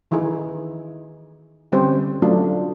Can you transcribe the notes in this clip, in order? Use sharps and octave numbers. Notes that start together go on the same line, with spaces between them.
D#3 E3 D#4 E4 G#4
D3 G3 C4 C#4 G4 C5
F#3 A3 C#4 D4 F4 F#4